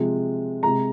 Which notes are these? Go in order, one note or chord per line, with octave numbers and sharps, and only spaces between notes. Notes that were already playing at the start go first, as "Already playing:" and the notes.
Already playing: C3 F3 G#3
C3 G#3 A#5